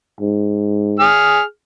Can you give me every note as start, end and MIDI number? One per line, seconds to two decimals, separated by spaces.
0.20 1.08 44
1.00 1.42 68
1.00 1.42 89